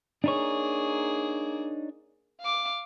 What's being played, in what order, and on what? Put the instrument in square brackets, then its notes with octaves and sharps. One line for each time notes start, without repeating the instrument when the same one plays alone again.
[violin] A#3 G#4 [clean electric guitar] D4 D#4 C#5
[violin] F5 D6